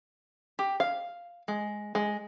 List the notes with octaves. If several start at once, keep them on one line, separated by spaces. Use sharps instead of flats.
G4
F5
G#3
G#3